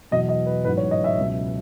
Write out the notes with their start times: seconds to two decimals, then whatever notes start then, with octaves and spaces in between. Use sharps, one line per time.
0.11 E2 B2 F#3 D#5
0.29 D#5
0.46 B4
0.64 A1 G#2 F#3 B4
0.77 C#5
0.91 D#5
1.04 E5
1.17 C#2 B2 F#3